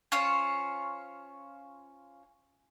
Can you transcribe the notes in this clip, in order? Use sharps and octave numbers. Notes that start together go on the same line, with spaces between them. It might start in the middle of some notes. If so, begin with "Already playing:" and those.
C#4 F4 C5 C#5